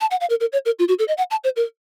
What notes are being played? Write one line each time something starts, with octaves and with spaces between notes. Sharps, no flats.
A5
F#5
F5
A#4
A#4
C#5
A#4
F4
F#4
A4
D#5
F#5
A5
C5
A#4